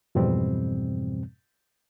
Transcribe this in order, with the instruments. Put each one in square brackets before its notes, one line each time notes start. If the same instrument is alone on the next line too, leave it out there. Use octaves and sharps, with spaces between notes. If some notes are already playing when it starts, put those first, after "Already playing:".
[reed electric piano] F2 G#2 B2 E3 G3 C4